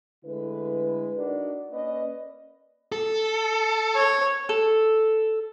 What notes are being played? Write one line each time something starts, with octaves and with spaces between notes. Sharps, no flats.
D3 G#3 A3 E4 B4
D4 D#4 F#4 A#4 D5
A#3 C#4 B4 D5 D#5
A4
C#5
A4